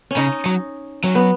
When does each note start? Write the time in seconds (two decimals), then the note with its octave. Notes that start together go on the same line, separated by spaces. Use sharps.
0.11 C#4
0.17 C#3 D#4
0.46 F#3
1.04 F#3 C#4
1.15 B3